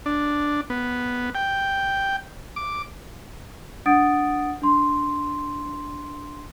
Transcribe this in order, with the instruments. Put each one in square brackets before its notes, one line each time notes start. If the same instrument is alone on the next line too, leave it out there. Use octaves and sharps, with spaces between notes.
[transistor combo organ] D4
B3
G5
D6
[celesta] D4 F#5 D#6 A6 D7
D4 C6